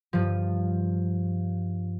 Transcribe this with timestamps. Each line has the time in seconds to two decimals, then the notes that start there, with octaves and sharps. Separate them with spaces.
0.13 G2 F3